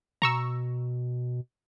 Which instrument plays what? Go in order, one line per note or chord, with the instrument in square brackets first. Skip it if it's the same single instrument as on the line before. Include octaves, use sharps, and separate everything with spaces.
[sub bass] B2 [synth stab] A#5 C#6 E6